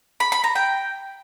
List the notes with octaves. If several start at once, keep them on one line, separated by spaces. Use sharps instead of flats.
B5
B5
A#5
G5